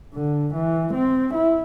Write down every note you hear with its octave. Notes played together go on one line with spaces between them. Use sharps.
D3
E3
C4
E4